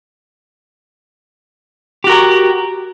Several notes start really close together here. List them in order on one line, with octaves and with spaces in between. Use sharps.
G4 F#4 A#4